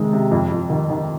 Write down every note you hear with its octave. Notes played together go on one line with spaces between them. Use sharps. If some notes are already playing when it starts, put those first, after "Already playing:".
Already playing: C3 D#3 G#3
C3
F2
F2
D#3
D#3